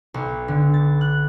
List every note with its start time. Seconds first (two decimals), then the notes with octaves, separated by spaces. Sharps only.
0.14 B1
0.48 D3
0.74 A6
1.01 F#6